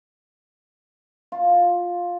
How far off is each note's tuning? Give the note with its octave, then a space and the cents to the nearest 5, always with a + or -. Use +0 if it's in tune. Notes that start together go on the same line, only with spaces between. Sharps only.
F4 +10